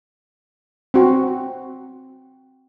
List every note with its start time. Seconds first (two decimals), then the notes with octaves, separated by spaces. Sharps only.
0.94 C4 F#4